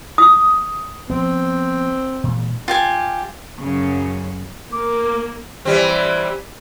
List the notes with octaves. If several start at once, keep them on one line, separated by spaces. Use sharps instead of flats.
D#6
F3 B3 C4
A#2 E3 G#3
F4 G4 G#5
F#2 C#3
A#3 D6
E3 G3 C4